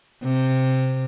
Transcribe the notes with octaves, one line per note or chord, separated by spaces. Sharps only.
C3